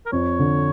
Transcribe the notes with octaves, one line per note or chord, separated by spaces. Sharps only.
A#4
F2 C#5
D3